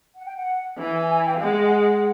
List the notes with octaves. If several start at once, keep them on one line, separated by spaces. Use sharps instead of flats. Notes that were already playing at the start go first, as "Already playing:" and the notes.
F#5
G5
F#5
E3 G#5
G#5
G#5
G5
F5
G#3 F#5